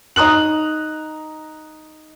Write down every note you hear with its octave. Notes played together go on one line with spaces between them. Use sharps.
D#4 A#5 D#6 F#6 F#7